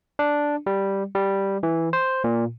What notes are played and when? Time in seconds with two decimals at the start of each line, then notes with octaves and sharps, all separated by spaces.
0.19 D4
0.66 G3
1.15 G3
1.63 E3
1.93 C5
2.24 A#2